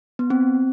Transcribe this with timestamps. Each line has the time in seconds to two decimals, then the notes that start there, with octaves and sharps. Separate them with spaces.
0.19 B3
0.30 C4